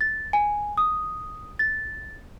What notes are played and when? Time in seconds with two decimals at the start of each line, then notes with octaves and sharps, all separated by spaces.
0.01 A6
0.33 G#5
0.77 D#6
1.59 A6